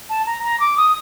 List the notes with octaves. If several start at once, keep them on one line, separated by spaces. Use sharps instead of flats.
A5
A#5
A#5
D6
D#6